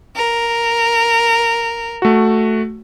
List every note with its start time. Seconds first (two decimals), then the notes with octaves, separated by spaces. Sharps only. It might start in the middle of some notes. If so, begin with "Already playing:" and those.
0.16 A#4
2.02 A3 F#4